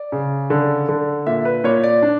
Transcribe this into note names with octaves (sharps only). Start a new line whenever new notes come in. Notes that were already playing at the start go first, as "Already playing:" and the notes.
Already playing: D5
C#3
D3
D3
A#2 E5
B4
A#2 C#5
D5
D4